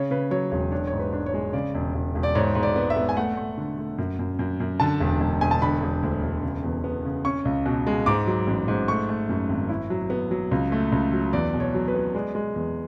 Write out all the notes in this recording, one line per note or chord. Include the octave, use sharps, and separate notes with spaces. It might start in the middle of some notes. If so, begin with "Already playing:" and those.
Already playing: C#3 C#5
C#3 B4
F#3 C#5
E1 C#5
D4 C#5
C#5
G#2
B4
D4
C#5
G#3
C#3 D5
E1
E1
E1
D5
G#2 C#5
G#2
D5
B3
E5
B3
G#5
A3 F#5
A3
D3
A3
F#2
F#2
F#2
F#2
D3 A5
E1
E1
E1 G#5
A5
D3 B5
E1
D2
E1
C#3
E2
B3
C#3
C#4 C#6
C#2
B2
G#3
G#2 D6
F#3
A1
G#2
A3 C#6
A3
F#2
G#1
E4
F#3
B3
F#3
C#2
A3
C#2
F#3
E2 D5
B2
C#5
F#3
B4
B3
G#3 D5
G#3
E2